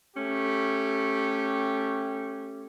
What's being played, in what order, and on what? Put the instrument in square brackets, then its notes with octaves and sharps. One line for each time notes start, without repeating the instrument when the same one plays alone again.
[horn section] A3 C#4 G4